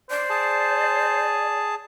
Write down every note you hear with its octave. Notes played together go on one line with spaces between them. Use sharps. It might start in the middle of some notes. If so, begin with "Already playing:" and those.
C5 D5
G#4 A5